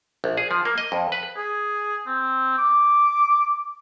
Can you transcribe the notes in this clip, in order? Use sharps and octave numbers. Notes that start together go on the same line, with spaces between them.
A#1
G#4
F3
A#3
D#5
F2
B4
G#4
C4
D6